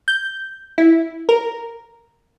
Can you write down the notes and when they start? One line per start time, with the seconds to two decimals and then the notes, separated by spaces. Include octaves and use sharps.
0.08 G6
0.78 E4
1.29 A#4